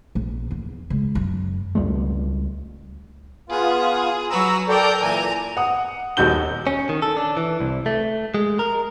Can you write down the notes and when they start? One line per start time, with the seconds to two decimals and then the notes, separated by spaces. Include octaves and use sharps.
0.15 A#1
0.51 E2
0.90 C#2
1.15 F#2
1.75 C#2 G3 A3
3.49 B3 F4 G#4
4.30 F#3 F#4 B4 A#5 E6
4.68 A4 A#4 D5 G5 G6
5.01 A#2 E3 G#5 A#5
5.57 F#5 D#6
6.17 D#1 D#2 F#4 G6 G7
6.67 C#4
6.89 D#3
7.02 A4
7.17 D4
7.37 E3
7.60 C2
7.86 A3
8.34 G#3
8.59 A#4